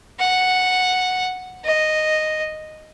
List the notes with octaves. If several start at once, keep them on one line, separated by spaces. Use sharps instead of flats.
F#5
D#5